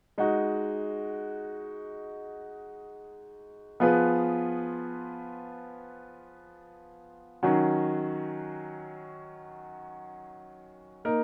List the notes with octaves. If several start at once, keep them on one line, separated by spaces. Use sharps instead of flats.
G#3 D#4 F#4
F3 B3 F4 G#4 B4
D#3 F#3 C#4 F#4
A#3 D#4 A#4